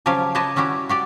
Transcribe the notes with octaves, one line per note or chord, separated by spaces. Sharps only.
C#3 F3 F#3 C#4 G4 F5
G4 B4 C#5 D#5 A5
G3 C#4 E4 F#4 G4
F#4 G4 D5